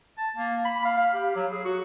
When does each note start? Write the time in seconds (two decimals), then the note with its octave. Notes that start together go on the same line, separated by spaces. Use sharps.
0.17 A5
0.36 A#3
0.65 B5
0.85 F5
0.97 F5
1.13 G4
1.35 F#3
1.51 G#4
1.65 F#4